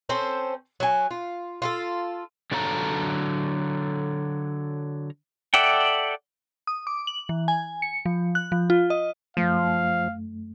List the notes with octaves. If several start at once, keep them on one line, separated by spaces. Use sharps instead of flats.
C4 C#4 A4 C5
F#3 G#5
F4
F4 F#4 A4
D3 F#3 A4 C#5 F5 A#5
A4 D5 E5 F#5 G5
D#6
D6
F#7
E3
G#5
C#7
F3
F#6
F3
F4
D#5
F#2 F3 A3 F5